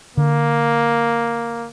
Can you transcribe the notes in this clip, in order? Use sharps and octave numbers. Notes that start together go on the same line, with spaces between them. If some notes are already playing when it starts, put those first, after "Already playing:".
D3 A#3